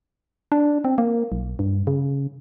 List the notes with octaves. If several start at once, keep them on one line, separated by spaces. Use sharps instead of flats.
D4
C4
A#3
B1
G2
C#3